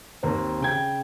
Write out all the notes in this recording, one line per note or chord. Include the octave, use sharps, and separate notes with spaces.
D#2 A#3 C4
C#3 G5 G#6